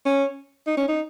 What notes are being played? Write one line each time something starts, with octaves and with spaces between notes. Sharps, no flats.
C#4
D#4
C#4
D#4